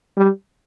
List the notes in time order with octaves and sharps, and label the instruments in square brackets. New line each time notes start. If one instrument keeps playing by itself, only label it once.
[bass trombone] G3